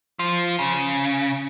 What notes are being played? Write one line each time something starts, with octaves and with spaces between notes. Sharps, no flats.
F3
C#3